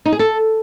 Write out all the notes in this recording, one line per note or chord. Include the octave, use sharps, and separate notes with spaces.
D#4
G#4
A4